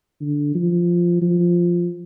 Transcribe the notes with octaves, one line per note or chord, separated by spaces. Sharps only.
D3
F3
F3